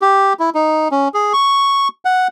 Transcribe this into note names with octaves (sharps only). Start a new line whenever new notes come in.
G4
E4
D#4
C#4
G#4
C#6
F#5